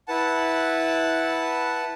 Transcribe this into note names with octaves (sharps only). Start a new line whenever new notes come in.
E4 B4 F#5 A5